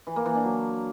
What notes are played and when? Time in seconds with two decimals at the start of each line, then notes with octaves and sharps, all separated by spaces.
0.07 E3
0.16 A#3
0.26 E3
0.35 D4
0.44 F#3